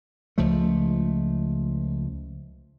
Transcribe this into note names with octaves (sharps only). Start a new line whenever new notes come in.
C#2 F3 G#3 A3